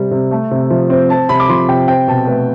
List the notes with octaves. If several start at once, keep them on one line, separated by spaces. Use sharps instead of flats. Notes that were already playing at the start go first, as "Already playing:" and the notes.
Already playing: C3 G3 C4
C3
A3
C3
F3
C4
C4 A5
C3 B5
D6
F3 C6
C3 G5
C4 G5
B2 A5
A3 B4